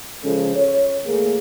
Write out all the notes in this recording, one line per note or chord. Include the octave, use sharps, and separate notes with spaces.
C#3 F3 G#3 C#4 A4
C#5
E2 A3 A#3 G#4